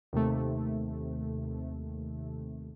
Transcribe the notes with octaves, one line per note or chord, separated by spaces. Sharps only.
D#2 C3 A3